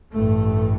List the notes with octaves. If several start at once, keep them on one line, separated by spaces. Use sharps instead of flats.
A1 G2 A3